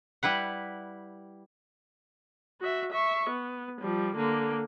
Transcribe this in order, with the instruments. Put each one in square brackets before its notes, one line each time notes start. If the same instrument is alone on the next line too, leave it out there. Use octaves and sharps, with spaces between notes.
[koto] G3 E4 B4 F#5
[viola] F#4 E5
E5 C#6
B3
F3 G3
D3 A#3